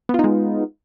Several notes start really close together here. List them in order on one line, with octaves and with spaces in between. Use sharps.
B3 F4 D#4 G#3